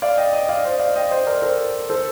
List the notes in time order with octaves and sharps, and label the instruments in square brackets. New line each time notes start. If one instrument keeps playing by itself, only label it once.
[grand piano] D5 F5
D#5 G5
D#5 G5
D5 F5
C5 D#5
D5 F5
D#5 G5
C5 D#5
A#4 D5
A4 C5
A4 C5